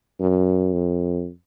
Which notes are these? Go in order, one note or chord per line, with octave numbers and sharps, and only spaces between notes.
F#2
F2